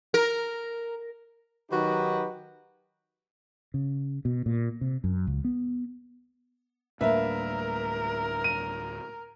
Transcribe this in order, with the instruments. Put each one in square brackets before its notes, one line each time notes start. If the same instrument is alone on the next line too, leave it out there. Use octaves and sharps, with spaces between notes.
[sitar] A#4
[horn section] D#3 F#3 D#4 F#4 G4 B4
[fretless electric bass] C#3
B2
A#2
C3
F#2
C#2
B3
[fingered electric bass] D2 A2 G3 [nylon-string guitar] A#3 D4 B4 [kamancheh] A#4 [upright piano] E5
[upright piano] D#7